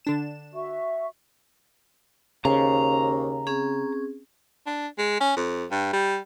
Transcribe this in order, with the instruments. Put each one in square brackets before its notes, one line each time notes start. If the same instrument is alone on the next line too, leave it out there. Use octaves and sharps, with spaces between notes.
[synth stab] D3 D4 E7
[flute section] F#4 E5 C#6
[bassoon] D#2 [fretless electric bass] C#3 [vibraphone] C#4 C5 C#6 [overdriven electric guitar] A#5
[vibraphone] C4 C#4 G#4
[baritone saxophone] D4
G#3
C#4
F2
G2
G3